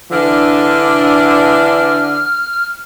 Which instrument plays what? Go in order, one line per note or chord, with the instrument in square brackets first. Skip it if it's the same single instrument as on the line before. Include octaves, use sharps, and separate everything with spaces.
[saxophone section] D3 D4 [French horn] E3 [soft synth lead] F6